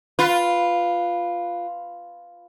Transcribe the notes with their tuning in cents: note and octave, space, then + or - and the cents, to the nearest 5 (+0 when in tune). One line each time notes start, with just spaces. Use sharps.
F4 +0 B4 +0